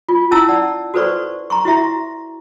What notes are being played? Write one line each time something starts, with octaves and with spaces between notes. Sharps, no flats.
F4
C#4 E4 A5 E6
D5 F#5
F#4 A4 B4 C5 D5 C#6
A#5 C6 C#6
E4 F#4 E5 A#5